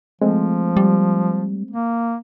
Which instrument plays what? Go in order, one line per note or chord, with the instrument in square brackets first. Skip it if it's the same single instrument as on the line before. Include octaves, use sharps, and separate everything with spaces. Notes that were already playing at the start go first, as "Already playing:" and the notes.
[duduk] F3 [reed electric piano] G#3 A3 C4
[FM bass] G3
[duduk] A#3